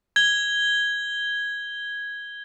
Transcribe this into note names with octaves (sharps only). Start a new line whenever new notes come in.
G#6 G7